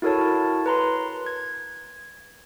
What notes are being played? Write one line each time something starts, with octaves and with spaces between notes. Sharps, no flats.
E4 F#4 A4 A#4 C#5 A5
B4 A#5 C6
G#6